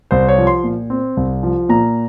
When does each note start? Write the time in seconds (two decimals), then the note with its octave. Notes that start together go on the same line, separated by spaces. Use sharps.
0.11 C2 C5
0.28 C#5
0.38 F3
0.47 C6
0.64 A#2
0.90 C4
1.17 C2
1.43 F3
1.69 A#2 A#5